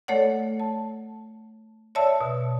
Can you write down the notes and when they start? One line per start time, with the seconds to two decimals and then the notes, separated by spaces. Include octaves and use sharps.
0.08 A3 A4 C#5 D5 F#5
0.60 A5
1.95 C#5 D5 E5 A5 E6
2.21 B2